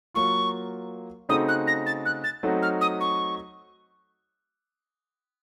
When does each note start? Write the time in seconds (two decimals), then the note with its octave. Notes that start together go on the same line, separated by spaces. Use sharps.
0.14 F#3 A#3 F4 C#6
1.29 C#3 A3 C4 D#4 F#4 D#6
1.48 F#6
1.67 A#6
1.86 A6
2.05 F#6
2.24 A6
2.43 F#3 A3 C4 D#4 F#4
2.62 F6
2.81 D#6
3.00 C#6